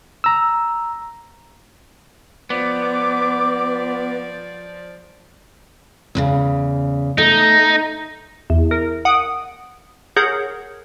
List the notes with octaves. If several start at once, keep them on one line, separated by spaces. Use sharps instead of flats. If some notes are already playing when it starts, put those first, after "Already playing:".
A#5 E6
F3 B3 D5 D6
E2 A2 C#3
A3 D#4
E2
A#4
F#5 D#6 D7
G#4 A#4 C#5 F#5 G6 G#6